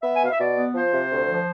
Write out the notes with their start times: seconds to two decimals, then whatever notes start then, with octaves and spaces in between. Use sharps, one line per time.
0.03 B3 E5
0.14 G#5
0.20 B2 F5
0.30 E5
0.39 B2 D5
0.56 B3
0.74 F3 C5
0.92 C3
1.11 D2
1.28 F3